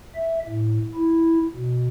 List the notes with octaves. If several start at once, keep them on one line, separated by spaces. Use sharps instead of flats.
E5
A2
E4
B2